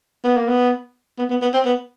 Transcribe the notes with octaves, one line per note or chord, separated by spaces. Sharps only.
B3
A#3
B3
B3
B3
B3
C4
B3